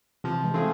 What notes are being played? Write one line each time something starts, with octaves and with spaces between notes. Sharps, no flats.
C3 E3 F3
E3 G#3
A3 C4 F4 G#4